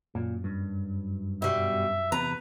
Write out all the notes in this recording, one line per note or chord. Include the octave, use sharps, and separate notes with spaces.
F#2 A#2
G2
B2 G3 E5
E2 C3 B4 A#5